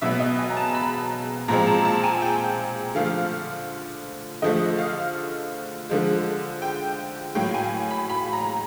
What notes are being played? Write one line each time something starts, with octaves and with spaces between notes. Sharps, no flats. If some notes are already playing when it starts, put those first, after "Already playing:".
B2 F#3 B3 E5
D#5
G#5
A#5
A5
B5
A#2 F3 G#3 C4 A#5
A5
A5
G#5
G5
D3 F3 A3 F5
D3 F3 A3 D#5
F5
D3 F3 G#3
G5
A2 F#3 A#3 G5
G#5
B5
B5
A#5